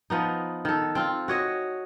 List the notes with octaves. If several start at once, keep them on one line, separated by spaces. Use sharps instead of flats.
F3 B3 D#4
D#3 A4
C4 F4
F#4 C#5 D#5